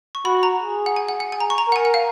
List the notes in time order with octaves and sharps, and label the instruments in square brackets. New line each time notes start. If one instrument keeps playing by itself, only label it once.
[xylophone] C#6
[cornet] F#4 [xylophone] B5
[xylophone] A#5
[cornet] G#4
[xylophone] F#5
G#5
F#5
F#5
G#5
A#5
C#6
A#5
[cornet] A#4 [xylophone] F#5
[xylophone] G#5
F#5
F5